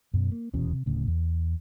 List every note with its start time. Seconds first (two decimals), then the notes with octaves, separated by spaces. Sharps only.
0.14 F#2 B2
0.32 A#3
0.54 D#1 E2 B2 C#4
0.71 C3
0.86 D1 A2 C#3
1.07 E2